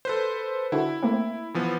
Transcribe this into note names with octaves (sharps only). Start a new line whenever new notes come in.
A4 B4 C5
D3 E4 F#4
A3 A#3 C4
E3 F3 B3